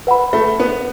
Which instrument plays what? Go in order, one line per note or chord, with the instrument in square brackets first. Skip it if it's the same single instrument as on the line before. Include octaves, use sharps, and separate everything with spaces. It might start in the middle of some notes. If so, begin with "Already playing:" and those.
[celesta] B4 F#5 B5
[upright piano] A3
B3